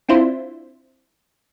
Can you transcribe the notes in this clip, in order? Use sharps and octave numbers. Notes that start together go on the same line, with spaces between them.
C4 D4 E4 F4 C5